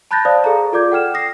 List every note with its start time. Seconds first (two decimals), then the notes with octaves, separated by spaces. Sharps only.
0.11 A5 B5 F#6 G6 A6 A#6
0.25 C5 D5 F5 A5 D#6
0.44 G#4 A4 F5 A#5
0.73 F4 A4 D5 D6 G6 G#6
0.92 F#5 G5 F6 E7
1.14 D#6 A#6 C7